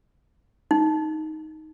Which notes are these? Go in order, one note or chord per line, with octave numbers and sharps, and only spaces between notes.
D#4